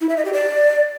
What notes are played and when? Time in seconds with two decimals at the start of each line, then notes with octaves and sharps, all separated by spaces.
0.01 E4
0.09 E5
0.17 D#5
0.25 G4
0.33 D5